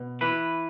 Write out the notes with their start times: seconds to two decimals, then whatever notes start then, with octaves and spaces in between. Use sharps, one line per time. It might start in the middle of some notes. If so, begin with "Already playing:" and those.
Already playing: B2
0.21 E3 B4